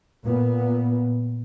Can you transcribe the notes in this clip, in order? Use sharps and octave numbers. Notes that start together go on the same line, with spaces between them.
A#2 B3